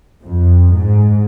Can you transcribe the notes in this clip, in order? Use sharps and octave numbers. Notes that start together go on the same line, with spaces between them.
F2
G#2